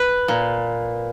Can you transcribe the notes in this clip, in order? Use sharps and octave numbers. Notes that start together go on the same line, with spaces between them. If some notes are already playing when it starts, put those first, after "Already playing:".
Already playing: B4
A#2